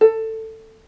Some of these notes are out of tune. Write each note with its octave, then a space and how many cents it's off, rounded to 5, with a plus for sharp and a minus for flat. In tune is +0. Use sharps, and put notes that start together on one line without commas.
A4 +15